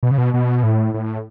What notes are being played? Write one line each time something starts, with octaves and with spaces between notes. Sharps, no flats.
B2
C#3
B2
B2
A2
A2